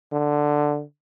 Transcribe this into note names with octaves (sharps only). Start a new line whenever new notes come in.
D3